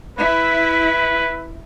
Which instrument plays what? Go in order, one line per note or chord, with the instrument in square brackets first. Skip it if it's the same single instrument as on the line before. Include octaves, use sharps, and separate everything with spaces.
[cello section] E4 E5 [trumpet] B4